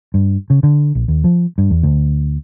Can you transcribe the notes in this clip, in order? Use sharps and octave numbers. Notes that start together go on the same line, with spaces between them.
G2
C#3
D3
A#1
D#2
F3
G2
E2
D2